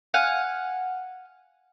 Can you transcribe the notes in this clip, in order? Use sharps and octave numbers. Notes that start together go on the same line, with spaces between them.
F5 F#5 G#5